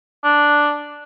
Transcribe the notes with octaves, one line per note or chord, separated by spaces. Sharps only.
D4